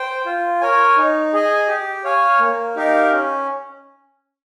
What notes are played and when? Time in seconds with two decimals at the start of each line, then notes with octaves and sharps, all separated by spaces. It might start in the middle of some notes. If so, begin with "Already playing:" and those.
Already playing: C5 G5
0.26 F4
0.61 A#4 C#5 G#5
0.97 D#4
1.33 G#4 D#5 G#5
1.68 G4
2.04 C#5 F5 G#5
2.39 A#3
2.76 D#4 G4 A#4 F5
3.11 C#4